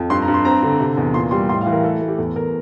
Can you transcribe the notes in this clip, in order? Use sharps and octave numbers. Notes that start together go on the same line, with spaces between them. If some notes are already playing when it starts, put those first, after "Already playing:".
Already playing: F2
G2 C6
A#5
G2
C6
C4 A#5
D3
C3
E2
A#2 C6
G3 C6
A2 C6
F5
E3
A#4
A3 A4
A3
G4
E2 A4
E2 A#4